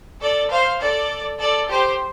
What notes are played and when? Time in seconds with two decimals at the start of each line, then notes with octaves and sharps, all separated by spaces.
0.21 A4 D5
0.50 C5 F5
0.80 A4 D5
1.39 A4 D5
1.69 G4 C5